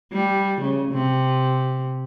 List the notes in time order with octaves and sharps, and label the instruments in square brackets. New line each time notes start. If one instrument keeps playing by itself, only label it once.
[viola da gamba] G3
C#3
C3